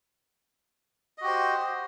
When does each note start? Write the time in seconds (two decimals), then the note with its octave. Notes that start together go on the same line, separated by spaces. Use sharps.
1.18 D#5
1.21 F#4
1.24 G4
1.27 C5